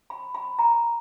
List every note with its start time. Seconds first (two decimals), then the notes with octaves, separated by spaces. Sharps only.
0.10 B5
0.35 B5
0.59 A#5